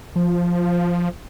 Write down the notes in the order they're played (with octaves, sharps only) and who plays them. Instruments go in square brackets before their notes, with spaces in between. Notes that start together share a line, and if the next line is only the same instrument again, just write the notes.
[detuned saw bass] F3